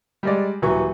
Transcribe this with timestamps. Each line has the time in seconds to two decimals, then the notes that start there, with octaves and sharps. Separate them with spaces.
0.23 G3 G#3 D5
0.62 D#1 E3 F#3 C#6